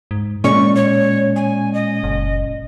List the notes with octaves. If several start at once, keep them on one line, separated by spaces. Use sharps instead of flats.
G#2
A#2 G#3 C#4 D5 C#6
C#5
G#5
D#5
F#1